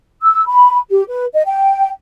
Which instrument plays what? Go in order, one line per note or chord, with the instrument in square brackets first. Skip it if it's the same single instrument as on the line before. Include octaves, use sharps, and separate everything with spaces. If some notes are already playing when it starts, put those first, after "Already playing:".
[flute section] E6
B5
G4
B4
D#5
G5